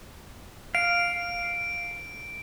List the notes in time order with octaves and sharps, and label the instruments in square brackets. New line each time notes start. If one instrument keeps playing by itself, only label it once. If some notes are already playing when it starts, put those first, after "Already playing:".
[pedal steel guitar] F5 [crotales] D7